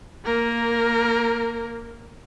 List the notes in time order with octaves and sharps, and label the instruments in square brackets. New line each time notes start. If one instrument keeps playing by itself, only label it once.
[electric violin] A#3 A#4